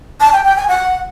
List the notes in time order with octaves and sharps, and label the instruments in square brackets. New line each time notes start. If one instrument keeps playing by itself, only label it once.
[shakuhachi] A5
G5
G5
G#5
F#5